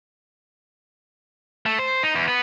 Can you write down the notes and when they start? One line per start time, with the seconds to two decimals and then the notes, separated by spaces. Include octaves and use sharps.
1.66 A3
1.79 C5
2.03 D#4
2.15 E2
2.28 B3